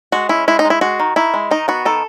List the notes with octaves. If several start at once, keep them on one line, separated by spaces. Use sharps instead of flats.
G#3 F#4
C#4 E4
G#3 E4
D#4
G#3
E4
G#3 F#4
D#3
D#3 E4
G#3
D#3 D#4
B3 F#4
D#3 A4